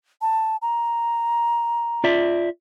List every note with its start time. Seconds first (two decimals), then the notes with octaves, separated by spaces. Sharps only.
0.22 A5
0.62 A#5
2.04 F4 D5 E5